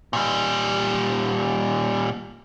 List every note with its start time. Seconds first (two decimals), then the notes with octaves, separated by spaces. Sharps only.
0.13 A#2 G3